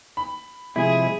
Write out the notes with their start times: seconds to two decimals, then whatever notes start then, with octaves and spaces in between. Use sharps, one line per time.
0.17 B5
0.76 C3 F3 G#3 E4 G#4